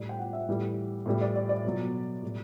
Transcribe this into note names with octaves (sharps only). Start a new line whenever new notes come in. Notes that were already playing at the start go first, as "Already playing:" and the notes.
Already playing: A2 G3 D5
G5
F#5
E5
A2 E3 G3
A2 E3 G3
D5
D5
D5
B2 F#3
A2 G3